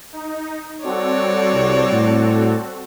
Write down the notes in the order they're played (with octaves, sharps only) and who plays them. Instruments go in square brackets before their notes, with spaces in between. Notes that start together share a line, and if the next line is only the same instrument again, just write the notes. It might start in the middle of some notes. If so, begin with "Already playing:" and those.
[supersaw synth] D#4
[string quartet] G3 C#5 D5 [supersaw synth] C4 F#4 A4
[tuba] C2
A2